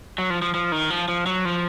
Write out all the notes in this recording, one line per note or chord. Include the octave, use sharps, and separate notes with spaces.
F#3
F3
F3
F3
D#3
F3
F3
F#3
F3